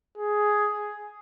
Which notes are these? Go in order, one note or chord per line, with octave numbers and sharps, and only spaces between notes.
G#4